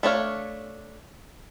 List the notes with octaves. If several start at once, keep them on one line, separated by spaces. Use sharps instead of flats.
A3 D4 C#5 F5